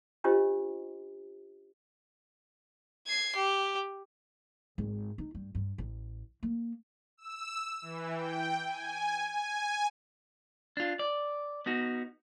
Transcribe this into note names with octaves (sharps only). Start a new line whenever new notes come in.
C#4 D4 F4 G4 C5 D#5
G#6 C7
G4
G#1
D#4
G2
G2
A1
A#3
E6
E3
G5
G#5
G#5
D4 F4
D5
B3 D#4 F#4